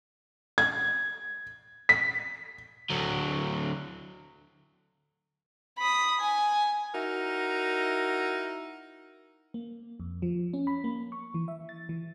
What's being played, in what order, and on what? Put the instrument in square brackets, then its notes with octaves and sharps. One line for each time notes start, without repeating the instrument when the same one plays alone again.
[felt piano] G#6
B6
[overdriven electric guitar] D2 F#3
[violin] B5 D#6
G#5
[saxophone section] D#4 E4 F#4 A#4
[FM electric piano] A#3
F2
F3
C#4
B5
A#3
C#6
E3
E5
A6
E3